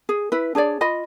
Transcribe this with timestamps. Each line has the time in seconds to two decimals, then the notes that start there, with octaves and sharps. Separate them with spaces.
0.09 G#4
0.32 E4 B4
0.55 D4 G#4 C#5 D5
0.81 F4 D#5 B5